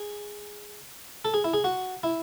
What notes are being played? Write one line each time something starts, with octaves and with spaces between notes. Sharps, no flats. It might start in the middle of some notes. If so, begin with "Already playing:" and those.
Already playing: G#4
A4
G#4
E4
G#4
F#4
E4